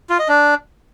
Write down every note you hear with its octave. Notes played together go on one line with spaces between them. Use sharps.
F4
D#5
D4